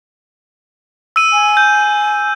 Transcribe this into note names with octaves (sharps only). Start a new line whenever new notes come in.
E6 D#7
G#5
G6